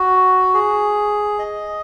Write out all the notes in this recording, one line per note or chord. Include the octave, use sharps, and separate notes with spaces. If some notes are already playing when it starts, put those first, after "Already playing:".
Already playing: F#4
G#4
D#5